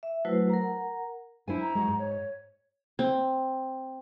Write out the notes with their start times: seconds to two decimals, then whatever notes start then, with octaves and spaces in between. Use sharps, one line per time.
0.03 E5
0.25 F#3 A3 E4 F#4 B4 C5
0.49 A#4 F#5 A#5
1.48 D4 E4 C5 G#5
1.60 A#5
1.75 G#3 F#4
1.88 G#2
1.99 C#5
2.99 C4